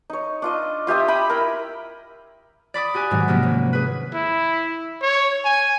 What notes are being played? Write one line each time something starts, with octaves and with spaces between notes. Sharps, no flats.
D#4 C#5
D4 F4 D#5
F4 G4 E5 D#6
G5 B5 D#6
E4 A#4
D5 B5 D6 D#6
F#4 G4 G#5 F#6
G#2 B2 D#3 F#3
C3 F3 A#3 C#4
G#1
G#4 B4
E4
C#5
G#5